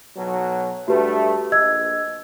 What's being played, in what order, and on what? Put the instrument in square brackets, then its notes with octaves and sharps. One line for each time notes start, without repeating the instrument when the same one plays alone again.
[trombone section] B1 B2 F#3
[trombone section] G2 A3 [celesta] F#4 G4 B4
[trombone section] A#1 [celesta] D#5 E6 G#6